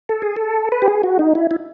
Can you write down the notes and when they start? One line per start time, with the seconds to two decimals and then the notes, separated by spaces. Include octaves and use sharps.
0.09 A4
0.22 G#4
0.36 A4
0.72 B4
0.82 G4
0.88 G#4
1.03 F#4
1.19 D#4
1.35 E4
1.51 E4